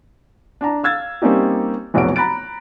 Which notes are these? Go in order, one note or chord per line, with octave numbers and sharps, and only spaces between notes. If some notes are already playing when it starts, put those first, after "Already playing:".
D4 A5 A#5
F5 E6 G#6 A6
G3 A#3 C4 C#4 D#4 G4
F1 B1 F#3 B3 C#5 D7
A#5 B5 F#6 A6 D7